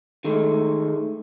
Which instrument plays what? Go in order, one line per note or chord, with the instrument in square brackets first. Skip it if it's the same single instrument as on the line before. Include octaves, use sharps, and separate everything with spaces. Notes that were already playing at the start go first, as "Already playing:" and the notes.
[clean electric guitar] D#3 G#3 A3